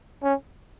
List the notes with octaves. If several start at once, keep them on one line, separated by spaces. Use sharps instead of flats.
C#4